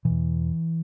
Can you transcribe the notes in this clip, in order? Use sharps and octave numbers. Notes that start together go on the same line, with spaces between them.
E2 B2 E3